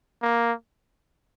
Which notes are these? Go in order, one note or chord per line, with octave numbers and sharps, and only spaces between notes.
A#3